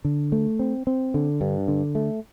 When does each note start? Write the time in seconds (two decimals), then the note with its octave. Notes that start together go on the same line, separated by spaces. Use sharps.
0.05 D3
0.32 A3
0.59 C4
0.87 C4
1.14 D3
1.41 G2
1.68 D3
1.95 A3